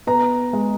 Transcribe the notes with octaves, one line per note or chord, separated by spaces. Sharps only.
B3 A#5
G#3